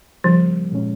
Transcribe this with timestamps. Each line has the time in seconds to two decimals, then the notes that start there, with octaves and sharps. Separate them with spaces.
0.24 C#3 F3 G3 A#3
0.72 A#2 G#3 C#4